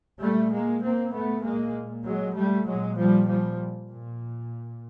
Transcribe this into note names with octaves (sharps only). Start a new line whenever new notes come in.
A#2 G3 A3
G#3 A#3
A#3 C4
A3 B3
A#2 G#3 A#3
F#3 G#3
G3 A3
A#2 F#3 G#3
F3 G3
F3 G3
A#2